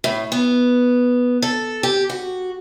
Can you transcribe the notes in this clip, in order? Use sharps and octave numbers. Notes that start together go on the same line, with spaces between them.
A2
B3
A4
G4
F#4